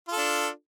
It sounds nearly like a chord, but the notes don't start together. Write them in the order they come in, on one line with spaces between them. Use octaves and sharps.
F4 A4 D4